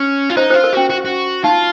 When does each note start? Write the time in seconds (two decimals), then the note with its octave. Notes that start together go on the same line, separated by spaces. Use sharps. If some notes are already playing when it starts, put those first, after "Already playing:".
Already playing: C#4
0.30 F4
0.37 D#4 C5
0.50 C5
0.54 F4
0.64 A#4
0.73 C#4 F#4
0.90 F#4
1.05 F#4
1.44 D#4 F4